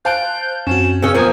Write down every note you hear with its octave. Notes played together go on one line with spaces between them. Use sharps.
C5 F5 A5 F#6 G6 D7
F#2 C4 C#4 F#4 E7
C#3 C#4 E6
E2 F3 A#3 G#5 D#6